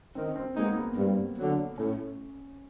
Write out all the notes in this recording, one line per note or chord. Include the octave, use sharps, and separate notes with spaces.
D#3 C4
C4
G#3 A#3 B3 D#4
B3
G2 C4
D3 F#3
A2 C#4